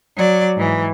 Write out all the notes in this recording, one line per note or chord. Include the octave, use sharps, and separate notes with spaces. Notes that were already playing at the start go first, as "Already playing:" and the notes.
F#3 D5
G#2 E3